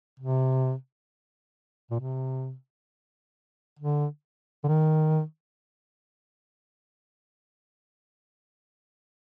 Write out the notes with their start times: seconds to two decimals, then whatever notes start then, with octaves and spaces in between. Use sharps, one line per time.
0.20 C3
1.91 A#2
2.00 C3
3.79 D3
4.64 D3
4.68 D#3